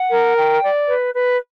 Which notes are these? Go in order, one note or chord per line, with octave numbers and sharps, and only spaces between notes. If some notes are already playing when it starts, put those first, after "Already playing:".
Already playing: F#5
A#4
G5
D5
B4
B4